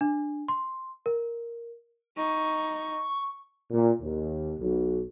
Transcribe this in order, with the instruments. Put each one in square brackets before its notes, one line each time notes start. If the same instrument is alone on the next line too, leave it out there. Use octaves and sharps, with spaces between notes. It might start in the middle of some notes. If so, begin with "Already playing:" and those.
[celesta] D4
C6
A#4
[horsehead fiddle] D#4 [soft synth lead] C#6
[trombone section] A#2
D#2
B1